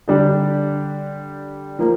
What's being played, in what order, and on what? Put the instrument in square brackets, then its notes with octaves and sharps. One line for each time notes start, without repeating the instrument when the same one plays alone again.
[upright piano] D3 G3 D4 G4
F3 A#3